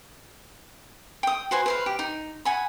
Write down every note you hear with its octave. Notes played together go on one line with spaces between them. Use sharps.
G5 D#6
F#4 B4 C5 G#5
B4 C5 F5
G4
D#4
F#5 G#5 B5